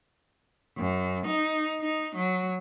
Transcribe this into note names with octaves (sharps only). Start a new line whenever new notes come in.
F#2
D#4
D#4
F#3